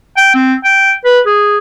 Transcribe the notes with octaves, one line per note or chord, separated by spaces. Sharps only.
G5
C4
G5
B4
G#4